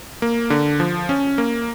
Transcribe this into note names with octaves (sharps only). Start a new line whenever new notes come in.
A#3
D3
F3
C#4
A#3